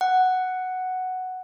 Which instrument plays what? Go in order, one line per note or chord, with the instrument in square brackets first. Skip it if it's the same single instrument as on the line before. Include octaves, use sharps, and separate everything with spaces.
[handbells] F#5